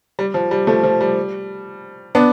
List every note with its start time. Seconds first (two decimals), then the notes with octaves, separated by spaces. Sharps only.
0.19 G3
0.34 F3
0.51 G3
0.67 F3 A3
0.83 F3
1.01 G3
2.15 B3 D4